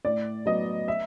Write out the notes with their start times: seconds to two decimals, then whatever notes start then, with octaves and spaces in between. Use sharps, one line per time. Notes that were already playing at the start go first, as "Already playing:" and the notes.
0.05 A2 D5
0.46 F#3 B3 D#5
0.88 E5